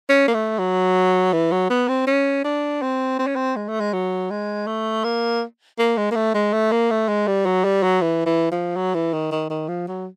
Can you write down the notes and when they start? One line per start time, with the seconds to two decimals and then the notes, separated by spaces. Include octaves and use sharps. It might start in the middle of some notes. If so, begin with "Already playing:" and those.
0.09 C#4
0.28 A#3
0.34 A3
0.59 F#3
1.33 E3
1.51 F#3
1.70 B3
1.89 C4
2.07 C#4
2.44 D4
2.82 C4
3.19 C4
3.27 C#4
3.36 C4
3.56 G#3
3.68 A3
3.80 G#3
3.93 F#3
4.30 G#3
4.67 A3
5.04 A#3
5.79 A#3
5.97 G#3
6.11 A#3
6.16 A3
6.34 G#3
6.53 A3
6.72 A#3
6.91 A3
7.08 G#3
7.27 G3
7.46 F#3
7.64 G3
7.83 F#3
8.02 E3
8.26 E3
8.51 F3
8.76 F#3
8.95 E3
9.13 D#3
9.31 D#3
9.50 D#3
9.68 F3
9.87 F#3